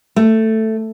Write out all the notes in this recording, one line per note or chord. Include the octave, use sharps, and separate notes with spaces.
A3